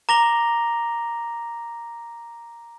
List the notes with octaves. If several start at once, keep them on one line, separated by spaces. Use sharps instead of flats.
A#5 D6 A#6 F7 G7